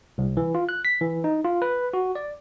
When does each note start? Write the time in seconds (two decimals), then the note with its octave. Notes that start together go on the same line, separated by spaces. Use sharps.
0.18 C2
0.37 E3
0.55 F4
0.69 F#6
0.85 B6
1.01 E3
1.24 D#4
1.44 F4
1.62 B4
1.93 F#4
2.15 D5